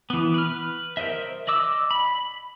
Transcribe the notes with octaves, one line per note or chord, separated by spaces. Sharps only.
E3 B3
B4 F6
A#4 C5 D#5 E5
D5 D#5 D6 E6
B5